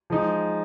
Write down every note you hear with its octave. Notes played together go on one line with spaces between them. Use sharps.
F3 G#3 D#4